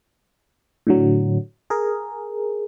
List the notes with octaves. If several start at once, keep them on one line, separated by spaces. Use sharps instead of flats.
A2 D3 F#3
G#4 A#4